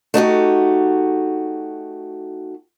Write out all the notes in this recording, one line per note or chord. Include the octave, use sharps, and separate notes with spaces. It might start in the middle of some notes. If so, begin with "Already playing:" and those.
A3 D#4 F#4 G4